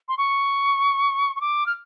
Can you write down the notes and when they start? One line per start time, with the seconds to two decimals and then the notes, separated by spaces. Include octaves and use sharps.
0.09 C6
0.18 C#6
1.36 C#6
1.41 D6
1.66 F6